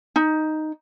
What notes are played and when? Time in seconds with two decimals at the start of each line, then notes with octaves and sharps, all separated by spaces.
0.16 D#4